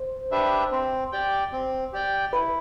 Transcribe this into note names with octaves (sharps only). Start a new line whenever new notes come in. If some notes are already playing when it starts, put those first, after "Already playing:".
Already playing: C5
D4 G4 B4 E5
C4
G4 D5 G5
C4
G4 D5 G5
E4 B4